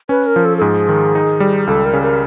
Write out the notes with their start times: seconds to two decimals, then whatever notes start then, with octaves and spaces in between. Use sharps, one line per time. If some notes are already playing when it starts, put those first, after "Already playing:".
0.09 C#4 B4
0.27 A#4
0.36 F3
0.45 A4
0.58 A4
0.61 G#2 G#4
0.89 D#3
1.15 D#4
1.40 G3
1.67 C#2 A4
1.85 A#4
1.93 C#3
2.03 A#4